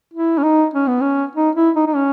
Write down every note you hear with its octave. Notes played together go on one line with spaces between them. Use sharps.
E4
C#4
D#4
C#4
B3
C#4
D#4
E4
D#4
D#4
C#4